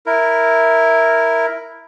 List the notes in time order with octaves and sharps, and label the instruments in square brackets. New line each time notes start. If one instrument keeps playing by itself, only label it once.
[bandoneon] E4 A#4